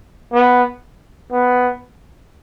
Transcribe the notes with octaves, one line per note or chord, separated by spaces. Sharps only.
B3
B3